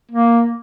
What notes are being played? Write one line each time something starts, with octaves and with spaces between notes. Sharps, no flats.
A#3